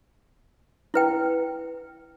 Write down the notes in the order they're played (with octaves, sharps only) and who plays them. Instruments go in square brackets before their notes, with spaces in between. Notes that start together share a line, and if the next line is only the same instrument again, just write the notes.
[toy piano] E4 B4 G5